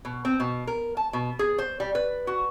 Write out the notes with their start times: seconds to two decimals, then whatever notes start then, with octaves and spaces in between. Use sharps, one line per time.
0.05 B2
0.25 C4
0.40 B2
0.67 A#4
0.97 A5
1.13 B2
1.39 G#4
1.58 C5
1.80 G3
1.95 B4
2.27 F#4